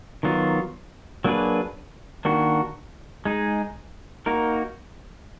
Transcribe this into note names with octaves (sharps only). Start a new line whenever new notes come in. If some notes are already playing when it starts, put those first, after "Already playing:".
D#3 F#3 B3 F4
F#3 A#3 D4 G#4 B4
D#3 A#3 D4 F#4
G#3 D#4 G#4
A#3 D#4 F#4 A#4